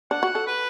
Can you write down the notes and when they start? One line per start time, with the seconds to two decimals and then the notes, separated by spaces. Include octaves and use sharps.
0.11 D4 F#5
0.23 F#4
0.35 A4
0.47 B4